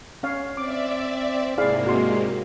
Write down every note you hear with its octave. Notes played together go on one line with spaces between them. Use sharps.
C#4 C#5 F5
C4 D5 E5 D6
G#2 C3 A#3 E4 G#4 D5 F5
G#3 F#4 C6